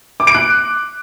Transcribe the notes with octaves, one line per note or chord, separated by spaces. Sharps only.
D6
D7
F#6